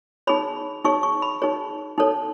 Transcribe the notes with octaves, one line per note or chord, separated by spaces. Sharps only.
D#4 G#4 C#5 B5
D#4 G#4 C#5 C#6
C#6
B5
D#4 G#4 C#5
D#4 A4 C#5